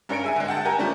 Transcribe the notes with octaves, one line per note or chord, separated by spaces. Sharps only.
G2 C#4 A#4 C#7 D7
G#4 E5 G#5
D3 G#3
F#5 G5 A5
G4 A#4 G#5 A#5
F3 G3 A3 C#4